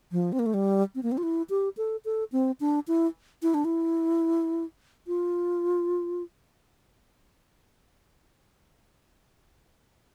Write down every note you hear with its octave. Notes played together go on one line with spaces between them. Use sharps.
F3
C4
A#3
A3
G3
C4
A#3
C4
F4
E4
G4
A4
A4
C4
D4
E4
E4
D4
E4
F4